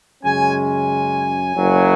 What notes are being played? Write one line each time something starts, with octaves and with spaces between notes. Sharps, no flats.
F#2 C#3 G#3 C#4 G#5
G#5
F#1 F#2 C#3 F#3